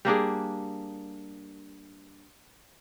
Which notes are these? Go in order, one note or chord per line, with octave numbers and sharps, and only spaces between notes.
G3 A#3 D4 G#4